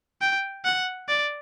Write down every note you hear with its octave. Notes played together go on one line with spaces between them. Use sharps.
G5
F#5
D5